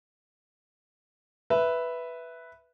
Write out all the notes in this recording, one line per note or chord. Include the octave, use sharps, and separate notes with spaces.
B4 E5